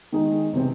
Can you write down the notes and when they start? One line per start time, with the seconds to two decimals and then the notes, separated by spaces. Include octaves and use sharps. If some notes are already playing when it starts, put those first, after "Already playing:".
0.12 D#3 G#3 D#4 G#4
0.53 C3 E3 C4